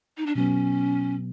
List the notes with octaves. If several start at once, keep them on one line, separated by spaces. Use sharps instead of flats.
D#4
D4
B2 F#3 B3 C#4